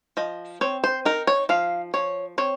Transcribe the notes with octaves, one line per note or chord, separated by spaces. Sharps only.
F3 D#5
C4 C#5
C5
D#4 A#4
C#5
F3 F5
F3 C#5
C4 C#5